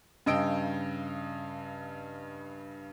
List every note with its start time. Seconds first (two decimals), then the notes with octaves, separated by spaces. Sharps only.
0.26 G2 C#3 D#5 G5 E6 D7